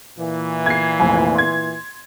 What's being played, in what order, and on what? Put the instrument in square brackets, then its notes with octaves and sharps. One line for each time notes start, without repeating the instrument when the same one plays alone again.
[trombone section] A#2 E3
[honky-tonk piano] G#6 C7
F1 A#1 G#5
C6 G#6